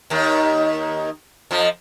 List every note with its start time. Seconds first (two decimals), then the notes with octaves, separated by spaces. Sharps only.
0.10 D#2 D#3
1.51 F2 F3